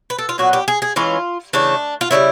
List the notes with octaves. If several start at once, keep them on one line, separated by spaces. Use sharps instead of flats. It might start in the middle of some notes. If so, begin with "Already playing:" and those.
B4
A4
F4
A#2 F#3 B3 F#4
G4
G#4
G#4
E3 G#3 C#4 F4
C#3 E3 A3 D4
F4
C#3 E3 G3 E4